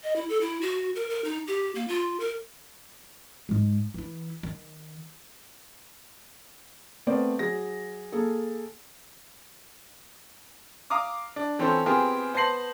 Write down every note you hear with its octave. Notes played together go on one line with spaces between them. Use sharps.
D#5
E4
A4
E4
F#4
A#4
A#4
D#4
G4
A#3
F4
A#4
G#2 G#3
E3 E4
D#3
A3 B3 C4 A#4 C5 D5
F#3 G#4 A#6
A#3 G#4 A4
F5 A#5 D6 D#6
D4
E3 C4 C#4 F4 A4 C5
B3 C4 F4 G4 G#4 A#4
B3 C5 A5 A#6 C7 F#7